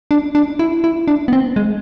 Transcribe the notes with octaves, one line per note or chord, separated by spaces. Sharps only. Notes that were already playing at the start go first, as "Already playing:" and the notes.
D4
D4
E4
E4
D4
B3
C4
G#3